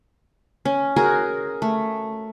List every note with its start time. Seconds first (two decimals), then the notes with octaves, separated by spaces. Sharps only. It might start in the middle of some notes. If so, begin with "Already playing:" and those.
0.65 C#4
0.96 F#4 G#4 A#4
1.62 A3